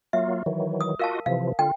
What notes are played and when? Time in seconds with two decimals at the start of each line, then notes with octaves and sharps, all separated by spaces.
0.13 F#3 A#3 F4 E5
0.46 D#3 E3 F#3
0.81 D#6
0.99 F4 F#4 A#4 D#5 F5 A5
1.26 C3 E3 F3 F5
1.59 D3 F4 G5